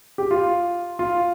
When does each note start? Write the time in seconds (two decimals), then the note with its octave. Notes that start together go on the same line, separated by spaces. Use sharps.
0.18 G4
0.31 F4
0.99 F4